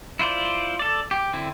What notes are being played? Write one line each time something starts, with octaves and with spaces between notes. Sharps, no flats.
E4 F4 C5 D5
A4 D5
G4
D3 C4 E4